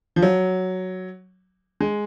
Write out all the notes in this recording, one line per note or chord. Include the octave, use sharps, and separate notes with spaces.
F3
F#3
G#3